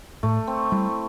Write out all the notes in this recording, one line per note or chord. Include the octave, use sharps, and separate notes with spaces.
A2 A3
C4
G3 E4